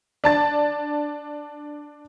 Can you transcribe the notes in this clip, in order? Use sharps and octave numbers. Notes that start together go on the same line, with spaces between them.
D4 A5 A6